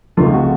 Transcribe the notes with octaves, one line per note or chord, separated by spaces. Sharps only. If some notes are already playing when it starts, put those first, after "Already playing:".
C#2 C3 F3 A3 F4
F#4